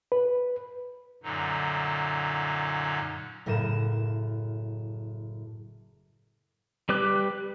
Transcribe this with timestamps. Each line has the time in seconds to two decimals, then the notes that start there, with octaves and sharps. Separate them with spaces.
0.12 B4
1.23 F#2 A#2 D3 F#3 D#4
3.46 F#1 A2 A#4 D#7 E7
6.89 G3 G4 B4 D6 F#6